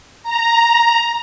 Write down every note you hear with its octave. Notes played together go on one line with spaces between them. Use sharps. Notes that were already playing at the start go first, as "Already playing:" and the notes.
A#5